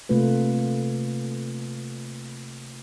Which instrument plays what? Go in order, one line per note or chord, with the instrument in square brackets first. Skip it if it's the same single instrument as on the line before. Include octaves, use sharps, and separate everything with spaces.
[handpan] C3 A3 A#3 F4 B4